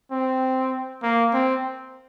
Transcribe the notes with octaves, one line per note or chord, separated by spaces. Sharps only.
C4
A#3
C4